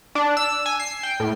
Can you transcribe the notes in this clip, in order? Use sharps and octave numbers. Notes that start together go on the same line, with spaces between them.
D4
E6
G#5
C7
G5
A2